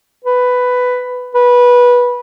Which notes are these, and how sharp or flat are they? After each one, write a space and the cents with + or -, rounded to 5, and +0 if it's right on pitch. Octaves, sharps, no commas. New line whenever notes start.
B4 +10
B4 -15